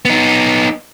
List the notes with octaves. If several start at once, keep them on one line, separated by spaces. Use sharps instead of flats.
B3 D#4